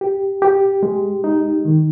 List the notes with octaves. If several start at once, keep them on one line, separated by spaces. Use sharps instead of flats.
G4
G4
G#3
D#4
D#3